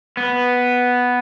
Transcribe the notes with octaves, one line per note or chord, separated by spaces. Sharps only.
B3